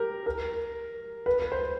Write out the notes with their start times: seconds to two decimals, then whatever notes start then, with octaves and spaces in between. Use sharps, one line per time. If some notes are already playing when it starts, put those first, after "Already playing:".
Already playing: G4 A#4
0.26 A#4
1.26 B4
1.42 B4
1.52 C5